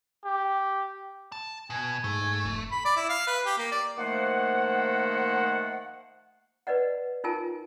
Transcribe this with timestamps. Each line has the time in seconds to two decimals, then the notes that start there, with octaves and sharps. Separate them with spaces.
0.25 G4
1.32 A5
1.70 B2 G#5
2.04 G#2 A3
2.21 G#2
2.44 F1
2.72 B5
2.85 D5
2.96 E4
3.09 F5
3.27 B4
3.46 G4
3.58 A#3
3.72 D5
3.98 D#3 F3 A3 A#3 C5 F#5
6.67 B4 D5 D#5 F#5
7.24 D#4 F4 A#4 G#5 A5